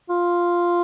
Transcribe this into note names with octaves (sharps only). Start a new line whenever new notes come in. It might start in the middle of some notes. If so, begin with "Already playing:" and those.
F4